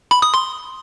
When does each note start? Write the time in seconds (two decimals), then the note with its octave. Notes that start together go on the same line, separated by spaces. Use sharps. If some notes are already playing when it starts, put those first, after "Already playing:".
0.11 B5
0.22 D#6
0.34 C6